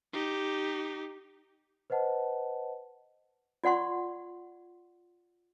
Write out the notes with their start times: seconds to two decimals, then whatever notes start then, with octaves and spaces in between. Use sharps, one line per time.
0.13 D#4 G4
1.90 B4 C5 D#5 F#5 A5
3.64 F4 D5 F#5 C6 C#6